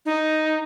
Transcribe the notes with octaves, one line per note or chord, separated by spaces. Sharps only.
D#4